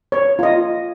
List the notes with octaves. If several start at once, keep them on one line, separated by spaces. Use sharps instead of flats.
C#5
F4 D#5